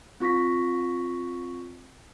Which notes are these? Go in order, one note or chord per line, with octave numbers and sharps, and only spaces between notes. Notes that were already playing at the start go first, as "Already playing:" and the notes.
C4 F4 C#6 A#6 B6